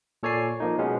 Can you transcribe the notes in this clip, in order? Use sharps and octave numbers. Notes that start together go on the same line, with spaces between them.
A#2 A4 C#5 D5 G#5 C7
F3 A#3 D#4
B2 G#3 B3 C#4